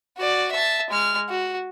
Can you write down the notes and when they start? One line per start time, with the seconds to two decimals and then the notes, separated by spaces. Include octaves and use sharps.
0.18 F#4 D5
0.52 E5 A5
0.90 G#3 F6
1.29 F#4